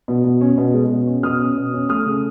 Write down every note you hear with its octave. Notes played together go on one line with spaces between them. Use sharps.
B2
B2
C#4
B2
G#3
B2
C#4
B2 D#6 F6
C#4
B2
C#4
A3 D#6 F6
C#3